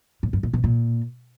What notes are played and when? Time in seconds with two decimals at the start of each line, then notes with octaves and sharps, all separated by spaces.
0.23 A2
0.33 G2
0.43 A#2
0.53 B2
0.64 A#2